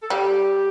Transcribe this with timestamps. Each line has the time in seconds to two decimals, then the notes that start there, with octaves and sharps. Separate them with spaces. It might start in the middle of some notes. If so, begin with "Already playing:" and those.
0.02 A4
0.10 G3 G4